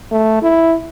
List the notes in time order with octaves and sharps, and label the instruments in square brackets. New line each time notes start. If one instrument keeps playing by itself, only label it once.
[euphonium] A3
E4